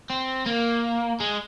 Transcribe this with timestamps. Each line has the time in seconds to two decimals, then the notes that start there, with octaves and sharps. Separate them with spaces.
0.10 C4
0.46 A#3
1.20 G#3